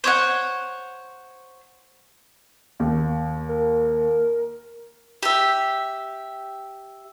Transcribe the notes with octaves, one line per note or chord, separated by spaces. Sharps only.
C5 C#5 D#5 F#5
D#2
A#4
G4 E5